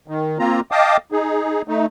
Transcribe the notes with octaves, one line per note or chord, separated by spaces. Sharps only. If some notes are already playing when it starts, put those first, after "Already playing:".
D#3
A#3 C4 F4 A#5
D#5 F5 G5 A5 D6 D#6
D#4 G#4
A3 D#4